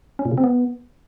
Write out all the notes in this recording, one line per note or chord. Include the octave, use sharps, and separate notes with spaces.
C#4
A#2
C#3
C4
B3